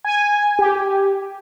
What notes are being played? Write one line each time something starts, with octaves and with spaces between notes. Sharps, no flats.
G#5
G4